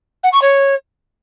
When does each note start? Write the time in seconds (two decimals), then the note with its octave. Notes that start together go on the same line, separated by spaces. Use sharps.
0.23 F#5
0.33 C#6
0.42 C#5